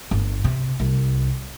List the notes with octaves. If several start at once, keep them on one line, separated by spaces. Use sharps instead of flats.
G1
C3
C2